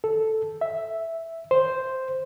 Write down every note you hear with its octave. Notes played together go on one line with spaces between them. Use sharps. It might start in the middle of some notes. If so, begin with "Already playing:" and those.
A4
E5
C5